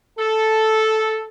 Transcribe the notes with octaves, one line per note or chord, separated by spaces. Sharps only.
A4